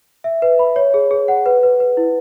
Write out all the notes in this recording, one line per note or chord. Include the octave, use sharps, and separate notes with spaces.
E5
B4
B5
C#5
G#4
G#4
F#5
B4
B4
B4
E4